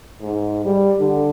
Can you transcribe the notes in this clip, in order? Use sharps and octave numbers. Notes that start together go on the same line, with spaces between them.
G#2
G3
D3